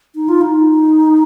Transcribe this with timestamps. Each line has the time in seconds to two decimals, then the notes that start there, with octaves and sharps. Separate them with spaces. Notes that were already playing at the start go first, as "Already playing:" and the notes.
0.15 D#4
0.29 F4
0.41 D#4